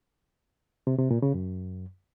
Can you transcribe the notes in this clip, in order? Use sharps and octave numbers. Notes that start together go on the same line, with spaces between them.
C3
C3
A#2
C#3
F#2